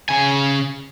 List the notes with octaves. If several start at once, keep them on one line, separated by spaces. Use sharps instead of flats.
C#3 G#5